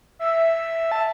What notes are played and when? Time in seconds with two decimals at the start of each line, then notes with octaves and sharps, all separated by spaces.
0.19 E5
0.92 A5